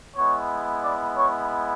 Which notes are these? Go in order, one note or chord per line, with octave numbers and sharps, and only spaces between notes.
G#3 B3 E4 C#5 C#6
D5 D6
C#5 C#6